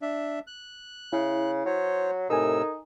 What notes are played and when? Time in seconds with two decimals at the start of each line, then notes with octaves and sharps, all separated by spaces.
0.02 D4 E5
0.47 F#6
1.13 C#3 E4
1.66 F#3 C5 C#5
2.30 A2 C3 D#4 A4 A#4 G#5 E6